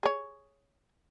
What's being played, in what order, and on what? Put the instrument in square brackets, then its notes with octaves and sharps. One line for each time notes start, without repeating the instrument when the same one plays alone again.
[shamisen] G#4 C#5